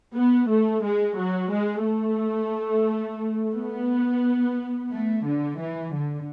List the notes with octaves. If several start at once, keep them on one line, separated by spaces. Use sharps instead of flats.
B3
A3
G#3
F#3
G#3
A3
B3
A3
D3
E3
D3